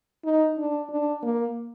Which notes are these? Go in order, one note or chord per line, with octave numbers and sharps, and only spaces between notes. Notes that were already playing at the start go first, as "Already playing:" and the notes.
D#4
D4
D4
A#3